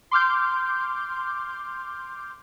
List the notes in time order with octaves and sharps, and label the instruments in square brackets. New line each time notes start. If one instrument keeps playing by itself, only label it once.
[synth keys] C6 D6 F6 G6